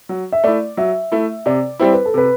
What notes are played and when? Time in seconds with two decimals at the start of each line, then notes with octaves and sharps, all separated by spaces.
0.09 F#3
0.32 E5
0.44 A3 E4 D5
0.77 F#3 E5
1.12 A3 E4
1.46 C3 D5
1.79 G3 C4 E4 C5
1.93 B4
2.06 A4
2.14 C3 B4